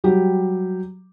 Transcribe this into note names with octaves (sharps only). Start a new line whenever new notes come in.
F#3 G3 G4